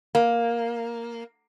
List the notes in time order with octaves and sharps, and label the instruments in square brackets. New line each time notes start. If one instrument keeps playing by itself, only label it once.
[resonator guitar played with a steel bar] A#3